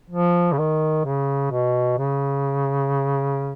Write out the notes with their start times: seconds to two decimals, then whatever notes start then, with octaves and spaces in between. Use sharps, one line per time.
0.10 F3
0.52 C#3
0.58 D#3
1.05 C#3
1.51 B2
1.98 C#3